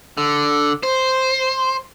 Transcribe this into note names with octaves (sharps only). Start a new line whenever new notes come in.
D3
C5